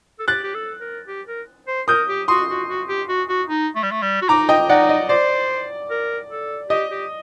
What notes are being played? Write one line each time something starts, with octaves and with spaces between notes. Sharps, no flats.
A4
G4 F#6 A6
G4
A4
A#4
G4
A#4
C5
A#4 D#6 G6
G4
F#4 C6 D#6
F#4
F#4
G4
F#4
F#4
D#4
A3
G3
A3
G3
F#4
D#4 A#5 D6
D#5 G5
D#4 D5 F#5
D#5
C5 D5
A#4
A4
G4 D#5
G4